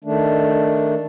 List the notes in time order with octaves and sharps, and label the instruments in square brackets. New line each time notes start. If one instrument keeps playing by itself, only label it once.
[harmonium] D#3 A3 D4